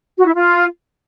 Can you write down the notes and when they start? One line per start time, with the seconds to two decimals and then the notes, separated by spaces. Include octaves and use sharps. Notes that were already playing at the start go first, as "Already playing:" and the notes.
0.18 F#4
0.26 E4
0.34 F4